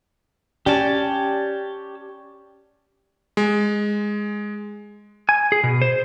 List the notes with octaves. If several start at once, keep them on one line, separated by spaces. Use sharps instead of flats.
C#4 G4 D5 G5 A5
G#3
G#5
G#4
B2
C5